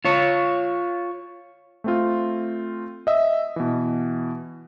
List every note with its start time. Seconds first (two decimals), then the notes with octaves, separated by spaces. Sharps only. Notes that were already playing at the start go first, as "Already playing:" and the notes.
0.05 F4 C#5
1.84 A3 C4 F4
3.07 D#5 E5
3.56 B2 E3